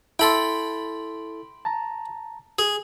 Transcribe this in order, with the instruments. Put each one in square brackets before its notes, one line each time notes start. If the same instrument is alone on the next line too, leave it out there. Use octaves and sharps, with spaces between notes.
[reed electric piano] E4 A4 A6 [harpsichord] G5 B5 C6
[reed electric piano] A5 A#5
[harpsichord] G#4